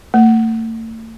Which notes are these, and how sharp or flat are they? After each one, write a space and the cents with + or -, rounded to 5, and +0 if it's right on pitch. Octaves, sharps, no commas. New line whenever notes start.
A3 +40